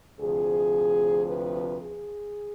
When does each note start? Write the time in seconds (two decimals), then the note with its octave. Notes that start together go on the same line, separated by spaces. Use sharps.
0.20 D2 C3 F3 G#4
1.26 B4
1.80 G#4